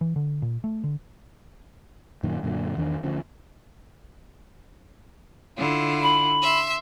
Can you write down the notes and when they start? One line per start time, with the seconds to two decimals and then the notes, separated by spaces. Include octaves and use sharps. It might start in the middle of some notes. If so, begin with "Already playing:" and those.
0.01 E3
0.16 D3
0.42 A#2
0.64 A3
0.84 D3
2.23 F#2 A#2 D#3
2.43 F#2 A#2 D3
2.77 E2 D#3 D4
3.03 D2 D3 F3 C#4
5.58 D3 E4 F4
6.03 B5
6.41 E5 C6